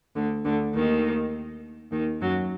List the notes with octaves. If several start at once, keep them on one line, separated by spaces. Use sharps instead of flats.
D2 D3
D2 D3
D#2 D#3
D#2 D#3
F#2 F#3